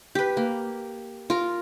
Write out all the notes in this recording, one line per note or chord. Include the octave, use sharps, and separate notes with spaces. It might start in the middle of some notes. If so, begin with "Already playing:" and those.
G4 B4
A#3
F4 A#4